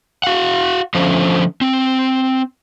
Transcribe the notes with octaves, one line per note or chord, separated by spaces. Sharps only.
F#4 F5 F#5
D3 F3 A3 C#4 C5
C4